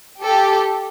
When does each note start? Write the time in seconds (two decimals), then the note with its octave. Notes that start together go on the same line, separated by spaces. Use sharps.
0.22 G4 A4